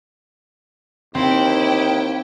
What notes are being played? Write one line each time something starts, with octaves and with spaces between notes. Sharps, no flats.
D#2 C4 E4 G5